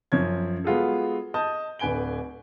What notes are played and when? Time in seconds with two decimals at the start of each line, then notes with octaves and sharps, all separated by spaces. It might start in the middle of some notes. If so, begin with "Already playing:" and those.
0.12 F#2 F3 C#5 G#6
0.64 G#3 B3 F4 F#4 G#4 A4
1.34 D#5 A5 D#6 G6
1.79 D1 D3 B4 G#5 D7 G7